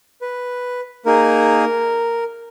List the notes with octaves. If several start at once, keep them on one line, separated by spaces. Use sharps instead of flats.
B4
A#3 D#4 G#4 A#4